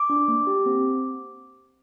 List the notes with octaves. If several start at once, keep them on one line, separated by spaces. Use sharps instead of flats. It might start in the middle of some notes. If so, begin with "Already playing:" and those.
Already playing: D6
D4
A#3
G4
C4